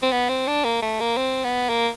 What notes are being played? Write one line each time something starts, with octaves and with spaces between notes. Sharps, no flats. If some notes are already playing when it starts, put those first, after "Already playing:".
C4
B3
C4
D4
A#3
A3
A#3
C4
B3
A#3